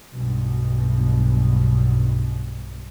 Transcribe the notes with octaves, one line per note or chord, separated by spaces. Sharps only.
B1 G2 B2